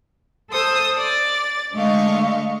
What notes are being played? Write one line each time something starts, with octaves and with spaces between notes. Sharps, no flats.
A4 C5 D#6 E6
D5 A6
D3 G#3 A3 D#5 F5 C#6